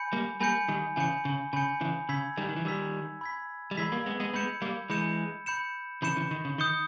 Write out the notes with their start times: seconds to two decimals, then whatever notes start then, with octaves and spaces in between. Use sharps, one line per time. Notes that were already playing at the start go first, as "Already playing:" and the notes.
Already playing: G#5 B5 G6 C#7
0.13 G3 A#3
0.40 G3 A#3 G#5 B5 G6 C#7
0.68 D#3 G3
0.96 C#3 E3 G#5 B5 G6 C#7
1.25 C#3
1.53 C#3 G#5 B5 G6 C#7
1.81 C#3 E3
2.08 C#3 B5 E6 G#6 B6
2.37 D#3 G3
2.49 D#3
2.56 E3
2.65 D#3 G3 B5 E6 G#6 B6
3.21 B5 E6 G#6 B6
3.71 G3
3.77 E3 G#3 B5 E6 G#6 B6
3.92 G3 A#3
4.06 G#3 B3
4.20 G#3 B3
4.33 G#3 B3 B5 G6 C#7 E7
4.62 G3 A#3
4.90 E3 G#3 B5 G6 C#7 E7
5.46 B5 G6 C#7 E7
6.02 C#3 E3 B5 G6 C#7 E7
6.16 C#3 E3
6.31 D#3
6.45 C#3
6.58 D#3 D#6 G6 C#7 G7